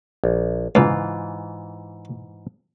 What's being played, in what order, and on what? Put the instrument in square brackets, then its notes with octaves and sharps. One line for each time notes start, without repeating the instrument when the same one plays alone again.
[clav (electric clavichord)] A#1
[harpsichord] C#2 B2 [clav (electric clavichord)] G#2 E3 F4